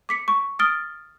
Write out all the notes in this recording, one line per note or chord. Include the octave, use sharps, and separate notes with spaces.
D6 B6 C#7
C#6
D#6 F6 A6 D7 G7